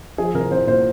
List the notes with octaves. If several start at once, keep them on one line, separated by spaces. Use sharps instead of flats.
F3 G#4
C2 A#4
C2 C5
A#2 C5